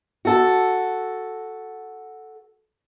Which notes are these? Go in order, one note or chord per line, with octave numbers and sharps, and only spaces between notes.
F#4 A4